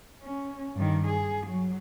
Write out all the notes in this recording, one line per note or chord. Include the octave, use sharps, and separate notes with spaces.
C#4
G2 D#3
G#4
F#3